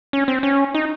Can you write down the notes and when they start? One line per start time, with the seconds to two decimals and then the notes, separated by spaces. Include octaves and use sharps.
0.13 C#4
0.28 C4
0.43 C#4
0.75 D#4